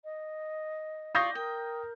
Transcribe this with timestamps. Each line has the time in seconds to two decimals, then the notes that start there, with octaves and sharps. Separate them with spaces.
0.04 D#5
1.15 F4 D5 C#6 D#6 G6 A#6
1.35 A#4 G5